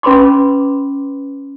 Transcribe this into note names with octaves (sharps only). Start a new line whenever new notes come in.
C#4 B4 B5 C6 D6